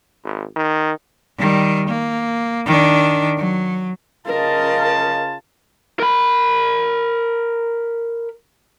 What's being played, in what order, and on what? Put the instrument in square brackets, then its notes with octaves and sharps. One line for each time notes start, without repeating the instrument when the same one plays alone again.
[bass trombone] G#1
D#3
[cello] D#3 G3
A#3
D#3 D4
F#3
[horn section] C#3 F4 A5 [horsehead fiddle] A#4 D#5
[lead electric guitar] A#4 B5